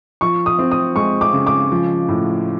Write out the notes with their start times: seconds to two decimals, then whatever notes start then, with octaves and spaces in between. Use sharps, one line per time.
0.21 F3 C#6
0.46 D#6
0.59 C4
0.71 D#6
0.96 G#3 C#6
1.21 D6
1.33 C#3
1.47 D6
1.72 F3
2.09 A2